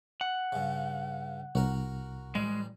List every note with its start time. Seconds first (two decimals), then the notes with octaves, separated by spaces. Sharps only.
0.21 F#5
0.52 G2 C#3
1.55 C2 F#4 A#4
2.35 A1 G3 G#3